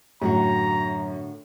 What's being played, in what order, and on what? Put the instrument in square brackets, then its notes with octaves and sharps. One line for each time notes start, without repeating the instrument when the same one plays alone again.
[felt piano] F#2 [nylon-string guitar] A2 D3 F#4 [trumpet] A#5